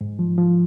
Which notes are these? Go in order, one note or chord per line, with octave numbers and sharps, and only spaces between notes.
G#2
F3
F3